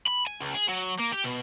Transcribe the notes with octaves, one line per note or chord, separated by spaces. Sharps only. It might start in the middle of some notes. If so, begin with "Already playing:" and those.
B5
G#5
C#2
G#4
F#3
A#3
G4
B2